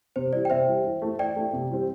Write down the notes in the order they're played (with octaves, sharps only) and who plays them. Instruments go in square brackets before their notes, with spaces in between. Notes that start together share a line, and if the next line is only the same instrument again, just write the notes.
[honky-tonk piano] C3 [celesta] C5
[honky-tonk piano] E3 G3 [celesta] D5
[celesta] G5
[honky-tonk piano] C3 [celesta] C5 E5
[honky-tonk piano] E3 G3
E3
A3 E4
[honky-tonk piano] E3 [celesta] D5 G5
[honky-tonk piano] A3 E4
C3
E3 G3 C4 G4